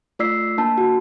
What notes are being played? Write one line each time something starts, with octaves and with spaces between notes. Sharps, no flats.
A3 F4 D5 E6 B6 C7
A#3 D4 A5
F#4